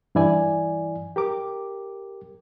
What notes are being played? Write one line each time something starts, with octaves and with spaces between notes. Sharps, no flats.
G2 E3 E4 D5 G#5
G4 A#4 D6